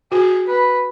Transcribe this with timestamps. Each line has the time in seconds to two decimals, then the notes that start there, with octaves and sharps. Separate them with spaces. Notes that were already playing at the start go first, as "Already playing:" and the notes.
0.12 F#4 G#4
0.47 B4